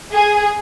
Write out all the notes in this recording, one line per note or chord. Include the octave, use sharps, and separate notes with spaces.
G#4